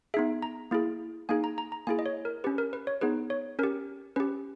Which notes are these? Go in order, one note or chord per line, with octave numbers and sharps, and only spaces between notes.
B3 D#4 G#4 E5
A#5
A#3 E4 G#4
A#3 D#4 G#4 G#5
A#5
A#5
A#5
A#3 E4 G#4 G#5
D#5
C#5
A#4
C#4 G4 B4
A#4
B4
C#5
B3 D#4 G#4 B4
C#5
C#4 G4 A#4
C#4 G4 B4